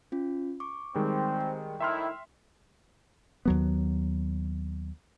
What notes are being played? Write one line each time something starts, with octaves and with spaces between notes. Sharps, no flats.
C#4 F4
C#6 D6
D#3 G3 G#3 C4
G5
A2 D#3 E4 E5 C6 F6
D#2 F#3 B3